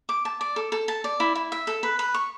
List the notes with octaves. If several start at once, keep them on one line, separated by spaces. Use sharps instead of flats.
D6
A5
D5
A4
A4
A5
D5
E4
E4
E5
A4
B4
B4
C#6